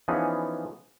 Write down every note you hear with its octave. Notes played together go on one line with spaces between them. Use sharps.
E3 F3 B3 C#4 D#4 G#4